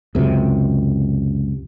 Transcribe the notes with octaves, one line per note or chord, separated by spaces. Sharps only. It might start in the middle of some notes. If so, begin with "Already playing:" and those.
C#2 F#2 C3